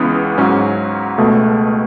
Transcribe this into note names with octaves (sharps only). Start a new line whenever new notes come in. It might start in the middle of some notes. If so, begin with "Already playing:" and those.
Already playing: C#2 C#3 E3 B3
G#2 F#3 C#4
C#2 B2 A3